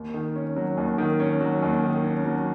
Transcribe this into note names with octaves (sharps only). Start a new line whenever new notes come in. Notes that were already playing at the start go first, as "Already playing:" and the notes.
Already playing: D#2
D#3
C#4
F#3
D#2
D#3
C#4
F#3
D#2
D#3
C#4
F#3